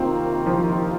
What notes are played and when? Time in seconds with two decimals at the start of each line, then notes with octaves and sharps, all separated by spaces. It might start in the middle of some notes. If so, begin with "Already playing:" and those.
Already playing: C3 D#3 A#3 C4 F4
0.46 F3